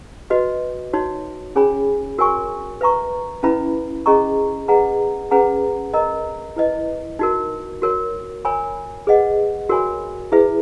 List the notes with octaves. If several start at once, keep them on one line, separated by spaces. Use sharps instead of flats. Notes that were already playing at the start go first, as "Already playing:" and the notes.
F#4 B4 D#5
D#4 F#4 C#5
C#4 G#4 C#5 G#5 B5
F#4 A#4 C#5 G#5 C#6
B4 E5 A#5 C#6
C#4 E4 B4 E5 B5
C#4 G#4 D#5 A#5 C#6
G#4 B4 D#5 F#5 A#5
C#4 G#4 B4 F#5 A#5
A#4 D#5 A#5
E4 B4 D#5
D#4 F#4 A#4
F#4 A#4 C#5
A#4 C#5 G#5 B5
G#4 B4 D#5 F#5
F#4 A#4 C#5 G#5 B5
E4 G#4 B4 E5